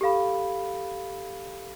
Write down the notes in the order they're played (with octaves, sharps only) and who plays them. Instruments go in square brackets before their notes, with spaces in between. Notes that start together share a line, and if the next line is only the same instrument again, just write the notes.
[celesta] G4 A4 F5 B5